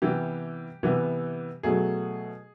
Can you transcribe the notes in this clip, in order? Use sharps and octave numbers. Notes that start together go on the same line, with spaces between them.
C3 E3 G3 B3 G4
C3 E3 G3 B3
B2 F#3 A3 G#4